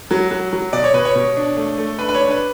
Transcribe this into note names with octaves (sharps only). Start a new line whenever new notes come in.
F#3
F#3
F#3
B2 D5
C#5
B2 B4
C#5
B2
D4
A3
A3
D4 B4
B4
D4 C#5
B4